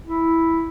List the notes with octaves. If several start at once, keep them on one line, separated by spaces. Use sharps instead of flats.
E4